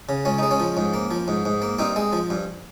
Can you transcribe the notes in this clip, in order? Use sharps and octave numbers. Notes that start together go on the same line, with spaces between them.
C#3
C#2 C#4
G#3 D#4
C#4
F3
G#2
A#3
F3
G#2
G#2
A#3
G2 C4 D#4
G#3
F3
G2